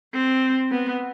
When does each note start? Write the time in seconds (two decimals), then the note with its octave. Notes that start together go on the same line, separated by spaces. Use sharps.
0.14 C4
0.71 B3